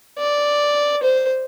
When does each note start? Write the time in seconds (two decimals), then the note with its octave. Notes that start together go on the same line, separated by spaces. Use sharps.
0.19 D5
1.03 C5